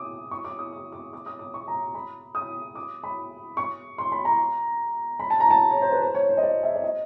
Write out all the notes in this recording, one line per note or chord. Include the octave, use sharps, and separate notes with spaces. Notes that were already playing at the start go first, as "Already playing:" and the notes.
Already playing: D6 D#6
C#6
D6
D#6
D6
D6
D6
D#6
D6
C#6
A#5
B5
D#6
D6
B5
C#6
C6
B5
A#5
B5
A5
A#5
A5
C#5
C5
B4
C5
C#5
C5
D#5
D5
E5
D5
D#5